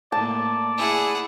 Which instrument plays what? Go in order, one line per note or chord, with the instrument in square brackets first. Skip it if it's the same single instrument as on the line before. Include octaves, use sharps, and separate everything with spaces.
[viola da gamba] A2 A#3 [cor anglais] D5 [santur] A5
[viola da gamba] E4 [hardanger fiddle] G#4 F#5